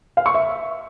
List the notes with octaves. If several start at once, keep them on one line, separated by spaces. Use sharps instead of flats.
F5
C#6
E5